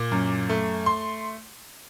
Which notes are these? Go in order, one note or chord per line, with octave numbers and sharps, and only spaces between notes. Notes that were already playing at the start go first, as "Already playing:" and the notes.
Already playing: A#2 D6
F#2
A3
C6